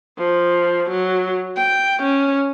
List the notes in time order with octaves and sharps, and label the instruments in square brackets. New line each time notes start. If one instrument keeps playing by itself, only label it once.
[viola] F3
F#3
G5
C#4